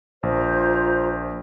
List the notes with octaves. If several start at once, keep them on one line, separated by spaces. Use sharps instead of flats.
A#1 F4 C5 A#5